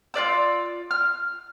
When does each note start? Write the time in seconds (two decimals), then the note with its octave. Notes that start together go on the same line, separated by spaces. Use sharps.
0.14 F4 B4 D5 E6
0.91 F6